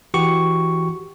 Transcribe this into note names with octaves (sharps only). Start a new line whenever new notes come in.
E3 F#4 G4 C#6